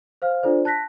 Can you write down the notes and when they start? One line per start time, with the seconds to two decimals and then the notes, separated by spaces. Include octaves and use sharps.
0.22 C5 F5 F6
0.43 D4 F4 A4 C5 D5
0.65 A5 F#6 A#6 B6